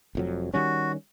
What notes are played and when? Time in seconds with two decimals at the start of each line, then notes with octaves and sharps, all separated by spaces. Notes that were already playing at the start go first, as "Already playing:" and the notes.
0.15 F1 F2 F#3
0.54 D#3 G3 C#4 F#4